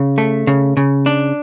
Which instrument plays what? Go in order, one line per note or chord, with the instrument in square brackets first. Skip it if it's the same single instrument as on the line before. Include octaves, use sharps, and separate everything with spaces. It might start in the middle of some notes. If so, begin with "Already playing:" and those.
Already playing: [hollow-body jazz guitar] C#3
A3
C#3
C#3
D4